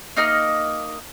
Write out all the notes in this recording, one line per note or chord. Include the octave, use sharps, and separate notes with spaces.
A#3 D#4 D#5 F6